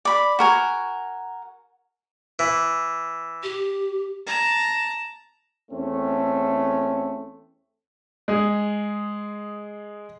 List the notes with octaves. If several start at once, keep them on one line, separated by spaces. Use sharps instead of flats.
D5 B5
F#4 A#4 G#5
E3
G4
A5 A#5
E2 A3 C4 C#4
G#3 G#4